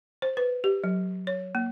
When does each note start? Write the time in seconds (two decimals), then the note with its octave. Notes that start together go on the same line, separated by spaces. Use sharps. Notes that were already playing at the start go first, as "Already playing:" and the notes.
0.22 C5
0.37 B4
0.64 G4
0.84 F#3
1.27 C#5
1.55 A#3